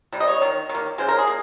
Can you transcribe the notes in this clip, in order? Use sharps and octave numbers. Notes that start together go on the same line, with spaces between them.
C3 G3
D#5
C#5
D#3 A#3
D#3 A#3
C#3 G#3 C5
A#4
G#4
A#3